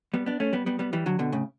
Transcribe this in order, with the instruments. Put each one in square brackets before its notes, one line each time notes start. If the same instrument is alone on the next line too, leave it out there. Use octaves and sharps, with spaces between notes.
[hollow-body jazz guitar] G3 B3
B3 D4
A3 C#4
G3 B3
G3 B3
G3 B3
E3 G3
D3 F#3
B2 D3
A2 C#3